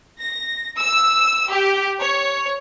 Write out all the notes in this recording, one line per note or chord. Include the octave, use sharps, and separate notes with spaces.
A#6
E6
G4
C#5